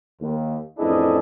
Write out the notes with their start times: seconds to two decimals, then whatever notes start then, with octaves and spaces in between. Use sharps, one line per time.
0.20 D#2
0.79 A1 F2 D4 E4 G#4 D#5